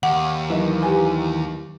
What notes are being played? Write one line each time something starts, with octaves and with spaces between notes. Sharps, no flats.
D#2 F#5
D#3 E3 F#3 D#5
G4 B4 G#5